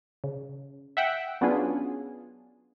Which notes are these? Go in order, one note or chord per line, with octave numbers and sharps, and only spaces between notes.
C#3
E5 F#5 G5
F#3 B3 C#4 D4 F4 G#4